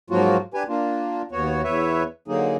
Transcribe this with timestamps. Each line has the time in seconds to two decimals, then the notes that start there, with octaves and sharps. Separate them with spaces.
0.10 G#2 F3 F#3 A#3 F4 F#4
0.54 D4 G4 B4 G#5
0.68 A#3 D4 F4
1.32 D#2 B3 F#4 C#5
1.64 E2 B4 C#5 E5
2.28 D3 F#3 A#3 D#4 G#4